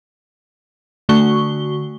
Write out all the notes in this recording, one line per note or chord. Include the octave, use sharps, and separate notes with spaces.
D3 A3 F#4 C#6 G7